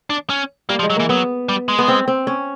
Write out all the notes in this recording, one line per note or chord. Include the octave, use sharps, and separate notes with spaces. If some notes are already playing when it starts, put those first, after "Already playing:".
D4
C#4
G3 A#3
F3
G#3
F#3
E3 A#3
F#3 B3
G3
G#3
B3
C4
C4
C#4